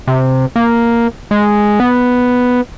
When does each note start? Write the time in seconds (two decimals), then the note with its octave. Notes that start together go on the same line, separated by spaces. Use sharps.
0.07 C3
0.56 A#3
1.31 G#3
1.80 B3